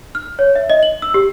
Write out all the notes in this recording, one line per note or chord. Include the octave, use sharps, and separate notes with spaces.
F6
C#5
E5
D#5
F#7
E6
G4